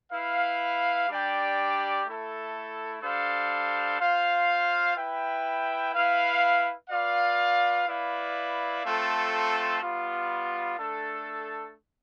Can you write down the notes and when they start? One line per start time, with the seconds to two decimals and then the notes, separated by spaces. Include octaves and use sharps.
0.11 E4 B4 F5
1.08 G3 D4 G4 D5 G5
2.05 A3 E4 A4
3.02 G3 D4 A4 C5 F5
3.99 F4 C5 F5
4.96 E4 B4 E5 G5
5.93 E4 B4 F5
6.90 F4 B4 D5 F5
7.87 E4 B4 D5 F5
8.84 A3 C4 F4 A4
9.81 G3 B3 F4
10.78 A3 D4 A4